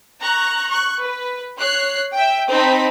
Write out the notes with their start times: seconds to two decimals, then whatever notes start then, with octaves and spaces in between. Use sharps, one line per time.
0.20 A#5 C#6 F#6
0.68 C#6 F#6
1.00 B4
1.58 C#5 F#6 C7
2.13 E5 G5
2.49 C4 D#4 A5 B5 B6